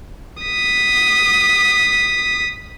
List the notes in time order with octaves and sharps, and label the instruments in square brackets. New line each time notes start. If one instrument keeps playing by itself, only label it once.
[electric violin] D#6 B6